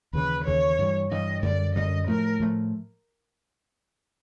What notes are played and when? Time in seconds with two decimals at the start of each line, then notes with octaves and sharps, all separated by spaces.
0.13 D#2 C#3 E3 B4
0.46 D#2 C#3 E3 C#5
0.79 G2 E3 G3
1.11 G2 E3 G3 D#5
1.42 F#2 D3 G3 D5
1.76 F#2 D3 G3 D#5
2.07 A2 F3 A3 A#4
2.40 A2 F3 A3